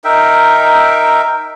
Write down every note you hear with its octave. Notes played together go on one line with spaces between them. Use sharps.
D#4 A#4 E5 G5